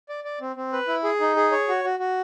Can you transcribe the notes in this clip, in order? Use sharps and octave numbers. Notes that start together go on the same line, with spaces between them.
D5
D5
C4
C4
B4
E4
G#4
D#4
G#4
C#5
F#4
F#4
F#4